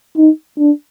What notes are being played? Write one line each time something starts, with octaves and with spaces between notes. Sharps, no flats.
D#4
D4